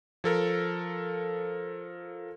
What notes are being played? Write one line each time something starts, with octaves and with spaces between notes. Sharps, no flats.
F3 A4 A#4